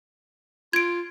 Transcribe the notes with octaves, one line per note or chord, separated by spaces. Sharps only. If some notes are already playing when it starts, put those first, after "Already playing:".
F4 G#6 D7